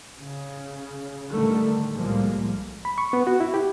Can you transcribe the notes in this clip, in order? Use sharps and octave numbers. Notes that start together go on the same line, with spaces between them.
C#3
A2 D3 D#3 G3 A3
C2 A2 F3 G3 G#3 A#3
B5
C#6
B3
F#4
E4
G4